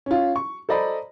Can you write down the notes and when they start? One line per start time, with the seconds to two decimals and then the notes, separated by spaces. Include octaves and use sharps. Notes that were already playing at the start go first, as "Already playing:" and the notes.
0.06 C#4 F4
0.36 C#6
0.69 A4 C5 D5 D#5 A#5 B5